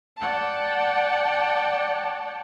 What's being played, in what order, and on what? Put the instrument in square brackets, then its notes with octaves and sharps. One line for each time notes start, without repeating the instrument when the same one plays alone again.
[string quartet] D5 F#5 G5 A5